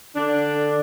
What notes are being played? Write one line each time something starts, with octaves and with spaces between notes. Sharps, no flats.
D3 D4